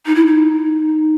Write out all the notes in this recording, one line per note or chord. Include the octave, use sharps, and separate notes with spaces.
D#4
E4
D#4